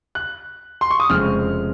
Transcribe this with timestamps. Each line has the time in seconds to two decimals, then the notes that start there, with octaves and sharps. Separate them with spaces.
0.15 F#6
0.81 C6
0.91 C#6
1.00 D#6
1.09 F1 F2 C#3 G#3 C4 F6